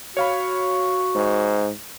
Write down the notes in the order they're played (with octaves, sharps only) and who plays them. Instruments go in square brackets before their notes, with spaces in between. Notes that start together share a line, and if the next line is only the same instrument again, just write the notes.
[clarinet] F#4 [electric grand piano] C#5 F5 B5
[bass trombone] G#2